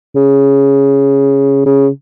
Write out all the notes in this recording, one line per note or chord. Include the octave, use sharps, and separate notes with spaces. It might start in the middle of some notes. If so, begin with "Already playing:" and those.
C#3
C#3